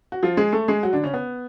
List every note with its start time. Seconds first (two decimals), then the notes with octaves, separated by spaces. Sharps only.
0.12 F#4
0.23 F3 F4
0.37 G#3 G#4
0.53 A3 A4
0.68 G#3 G#4
0.83 F#3 F#4
0.93 D3 D4
1.03 C#3 C#4
1.14 B3